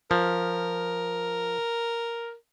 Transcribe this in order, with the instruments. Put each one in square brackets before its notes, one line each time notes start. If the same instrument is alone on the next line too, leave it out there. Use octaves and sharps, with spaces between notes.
[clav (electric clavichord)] F3 [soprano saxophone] A#4